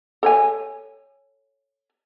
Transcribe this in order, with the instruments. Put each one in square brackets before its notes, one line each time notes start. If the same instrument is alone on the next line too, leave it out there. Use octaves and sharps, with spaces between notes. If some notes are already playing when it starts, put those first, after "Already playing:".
[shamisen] A4 C#5 G#5